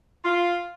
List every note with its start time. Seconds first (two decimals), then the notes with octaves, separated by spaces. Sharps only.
0.24 F4